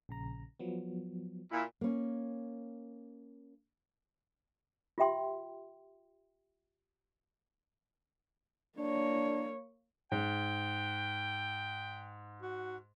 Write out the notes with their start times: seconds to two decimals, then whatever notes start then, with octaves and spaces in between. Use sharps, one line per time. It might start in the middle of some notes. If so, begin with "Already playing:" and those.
0.09 A#1 C#3 A#5
0.59 F3 F#3 B3
1.52 A#2 E4
1.81 A#3 C#4
4.98 F4 G4 E5 G5 C6
8.78 A#3 D4 C#5
10.12 G#2 G5
12.42 F#4